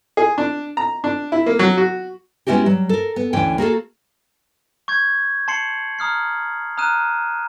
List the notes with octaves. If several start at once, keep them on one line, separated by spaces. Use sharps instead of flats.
G#4
D4
A#5
D4
E4
A#3
F#3
F#4
G#3 B3 C#4 E4 F#4 G4
F#3 G3
A4 A#4
B3
D2 E3 C#4 D4 G5
A#3 F#4 G#4 A4
C#6 G6 G#6
A5 C6 C7 C#7 F#7
A#5 D#6 F6 C7
A#5 D#6 F6 F#6 D#7 E7